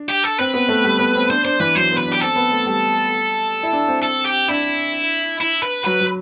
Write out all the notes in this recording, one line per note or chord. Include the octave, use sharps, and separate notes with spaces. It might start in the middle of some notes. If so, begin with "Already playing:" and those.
Already playing: D4
G4
A4
C4 B4
B3
A3
G3
B3
C4
D4 C5
D4 C5
E3 B4
F#3 C5
B3
B4
D4
G4
C4 A4
B3
A3
G3
E4
D4
C4
A4
G4
D4 E4
E4
B4
F#3 B4
F#3